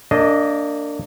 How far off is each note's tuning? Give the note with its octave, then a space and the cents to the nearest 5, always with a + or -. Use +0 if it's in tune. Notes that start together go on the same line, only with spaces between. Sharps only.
A#3 -35 D4 -5 D#5 +0